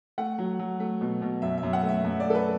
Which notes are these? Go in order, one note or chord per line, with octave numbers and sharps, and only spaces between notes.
A3 F#5
F#3
F#3
A3
B2
B2
F#2 E5
E5
F#2
F#5
A3
E5
F#2 E5
A3 D5
A4
B4